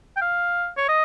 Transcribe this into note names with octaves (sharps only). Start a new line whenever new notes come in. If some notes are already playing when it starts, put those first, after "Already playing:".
G5
F5
C#5
D#5